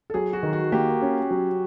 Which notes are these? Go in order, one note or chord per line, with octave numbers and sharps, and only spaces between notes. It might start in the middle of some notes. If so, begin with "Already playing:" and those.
A4
F#3 G#4
F#4
D#3
F#4
A#3 G4
C#4
F#3